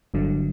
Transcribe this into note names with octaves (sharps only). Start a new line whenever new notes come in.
G1 G2 D3 F#3